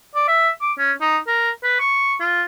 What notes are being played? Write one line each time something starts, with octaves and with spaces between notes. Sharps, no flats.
D5
E5
D6
C#4
D#4
A#4
B4
C#6
F4